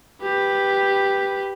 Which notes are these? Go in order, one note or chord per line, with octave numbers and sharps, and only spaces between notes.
G4 B4